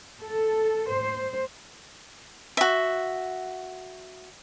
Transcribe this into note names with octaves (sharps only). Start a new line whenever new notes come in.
A4
C5
F#4 E5